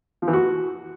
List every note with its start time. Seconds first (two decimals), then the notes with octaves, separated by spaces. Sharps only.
0.22 F3
0.28 E3
0.33 F#4